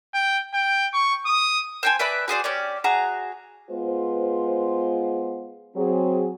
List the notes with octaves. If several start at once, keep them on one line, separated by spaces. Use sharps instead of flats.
G5
G5
C#6
D#6
C5 G5 G#5
B4 D5 E5 B5
F#4 G#4 C5 D5
C#4 G4 D5
F#4 G#4 A#5
G#3 B3 F4 B4 C5
F#3 C4 G#4